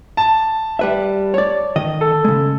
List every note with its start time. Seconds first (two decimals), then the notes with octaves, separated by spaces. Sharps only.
0.17 A5
0.79 G3 B4 E5
1.34 C#5 D5
1.76 D#3 D#5
2.01 A4
2.25 C#3 G#3